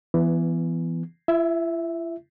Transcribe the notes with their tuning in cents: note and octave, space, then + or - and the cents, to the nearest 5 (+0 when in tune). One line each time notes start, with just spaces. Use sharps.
E3 +20 B3 +0
E4 +45 E5 +0